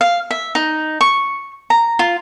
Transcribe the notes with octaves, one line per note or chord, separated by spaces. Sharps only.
F5
E5
D#4
C#6
A#5
F4